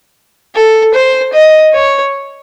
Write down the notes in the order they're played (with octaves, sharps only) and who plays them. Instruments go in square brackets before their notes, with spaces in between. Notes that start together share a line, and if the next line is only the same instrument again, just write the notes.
[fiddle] A4
C5
D#5
C#5